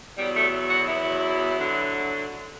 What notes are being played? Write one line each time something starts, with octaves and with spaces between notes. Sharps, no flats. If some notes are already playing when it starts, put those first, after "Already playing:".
E2 B2 F#3 G3
A3
F#4
E2 B2 F#3 E4
D3 F#3